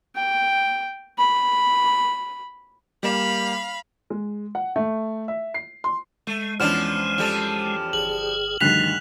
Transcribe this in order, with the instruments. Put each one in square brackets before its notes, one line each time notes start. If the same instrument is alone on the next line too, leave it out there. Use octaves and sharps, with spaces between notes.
[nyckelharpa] G5
B5
[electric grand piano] G3 A#3 E7 [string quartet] F5 B5
[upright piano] G#3
F#5
A3
E5
C7
C6
[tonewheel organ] G#3 [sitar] A3
[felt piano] E2 C#4 [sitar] F3 B3 D4 [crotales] F6 E7
[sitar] F3 G3 A4
[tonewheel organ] G1 G#4 [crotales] F#7
[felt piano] D2 G2 D#3 [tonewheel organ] F3 [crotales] F#6 B6 F7